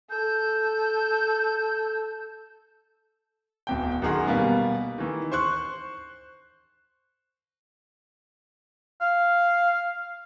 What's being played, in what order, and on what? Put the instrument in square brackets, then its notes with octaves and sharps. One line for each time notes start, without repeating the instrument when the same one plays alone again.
[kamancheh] A4 [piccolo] G6
[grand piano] D1 E2 G5
F#2 D#3 G#4 F#5 C6
B2 G3 A#3 B3
D#3 E3
C5 C6 C#6 F#6
[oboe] F5